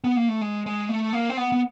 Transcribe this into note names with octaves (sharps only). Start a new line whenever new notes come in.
B3
A#3
A3
G#3
G#3
A3
A#3
C4
B3
B3